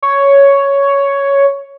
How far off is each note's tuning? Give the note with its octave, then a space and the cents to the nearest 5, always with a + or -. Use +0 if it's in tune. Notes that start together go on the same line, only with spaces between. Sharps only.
C#5 +5